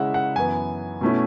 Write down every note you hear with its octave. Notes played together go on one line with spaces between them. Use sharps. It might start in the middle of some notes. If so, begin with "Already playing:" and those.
Already playing: C#3 G#3 C#4 E4 E5 F#5
F#5
F#2 E3 B3 G#5
B2 A3 C#4 E4